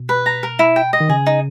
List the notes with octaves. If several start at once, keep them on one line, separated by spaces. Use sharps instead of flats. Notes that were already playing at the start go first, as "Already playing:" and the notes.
Already playing: B2
B4
A#5
A#4
E4
G5
D#5
D#3
C#3 G#4
D#4